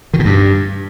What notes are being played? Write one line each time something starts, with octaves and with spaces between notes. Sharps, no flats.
D#3
B2
G2